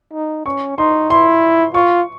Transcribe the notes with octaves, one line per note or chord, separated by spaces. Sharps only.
D#4
C#4 C#6
D#4 C6
E4 C6
F4 C#6